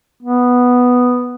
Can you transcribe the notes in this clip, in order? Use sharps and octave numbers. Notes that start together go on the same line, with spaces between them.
B3